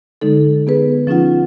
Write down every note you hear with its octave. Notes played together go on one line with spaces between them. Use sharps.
D3 G#3 D#4 A4
B3 G#4 B4
F3 C#4 D#4 F4 F#5